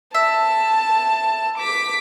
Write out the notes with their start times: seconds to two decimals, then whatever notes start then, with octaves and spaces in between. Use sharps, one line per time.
0.14 E5 A5
1.58 D6 B6